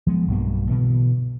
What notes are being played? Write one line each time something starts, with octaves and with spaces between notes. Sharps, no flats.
F3 G#3 B3
B1 G2 B2 A#3
B2 D3 E3